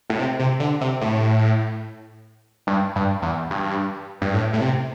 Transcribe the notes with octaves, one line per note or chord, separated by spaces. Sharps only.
A2
C3
C3
D3
C3
A2
G2
G2
E2
G2
G2
A2
A2
C3